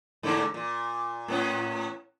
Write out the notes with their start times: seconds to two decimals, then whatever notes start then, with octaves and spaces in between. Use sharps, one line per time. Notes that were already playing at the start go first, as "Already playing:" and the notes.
0.23 G#2 D3 A#3
0.54 A#2
1.28 A2 B3 C#4